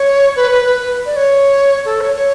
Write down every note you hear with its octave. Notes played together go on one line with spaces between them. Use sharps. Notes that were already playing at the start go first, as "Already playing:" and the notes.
Already playing: C#5
B4
B4
B4
D5
C#5
A4
C#5
C#5